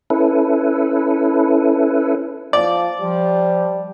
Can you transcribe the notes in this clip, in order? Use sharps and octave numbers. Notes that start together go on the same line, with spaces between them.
C#4 E4 A4 B4
F3 D5
F3 G3